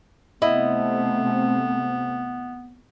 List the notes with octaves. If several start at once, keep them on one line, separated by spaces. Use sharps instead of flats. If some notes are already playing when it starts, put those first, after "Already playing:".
C3 A3 B3 C4 E4 D#5